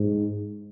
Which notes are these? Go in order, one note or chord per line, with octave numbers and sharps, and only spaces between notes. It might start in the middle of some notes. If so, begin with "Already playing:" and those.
Already playing: G#2